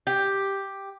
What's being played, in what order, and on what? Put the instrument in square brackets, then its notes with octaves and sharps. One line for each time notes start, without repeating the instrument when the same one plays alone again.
[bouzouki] G4